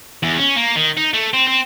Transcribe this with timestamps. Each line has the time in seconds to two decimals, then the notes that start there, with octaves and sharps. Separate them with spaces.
0.23 E2
0.38 C#4
0.56 A#3
0.76 D#3
0.97 D#4
1.14 A3
1.34 C4
1.48 C4